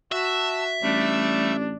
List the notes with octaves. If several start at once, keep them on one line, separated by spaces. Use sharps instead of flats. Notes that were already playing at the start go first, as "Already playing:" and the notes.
F#4 E5 A5
A1 G3 A3 D4